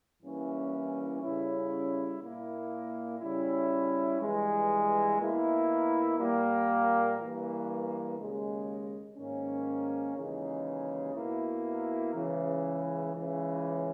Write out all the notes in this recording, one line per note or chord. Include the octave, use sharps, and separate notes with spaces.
G2 E3 A#3 C#4 E4
C#3 G3 C#4 E4
A#2 A#3 E4
C#3 G3 C#4 E4
G2 E3 G#3
B2 A#3 E4
A#2 G3 A#3
G2 E3 A#3
D#2 C#3 G#3
G#2 D#3 A#3 C#4
D#2 C#3 E3 G#3 D#4
B2 A#3 E4
C#2 C#3 E3
C#2 C#3 E3